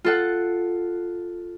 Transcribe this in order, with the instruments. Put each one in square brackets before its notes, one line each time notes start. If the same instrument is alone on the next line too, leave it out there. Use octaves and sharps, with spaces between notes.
[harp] F4 A4 F#5